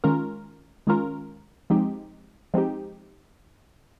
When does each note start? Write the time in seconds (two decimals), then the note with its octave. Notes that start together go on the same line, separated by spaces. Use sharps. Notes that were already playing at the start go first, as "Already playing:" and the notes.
0.04 D#3 G#3 C#4 F4 A#4
0.87 D#3 G#3 C#4 F4 A#4
1.70 F3 G#3 C4 D#4 G4
2.54 F3 G#3 C4 D#4 G4